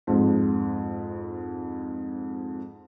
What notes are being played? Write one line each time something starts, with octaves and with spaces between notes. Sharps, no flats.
F2 G#2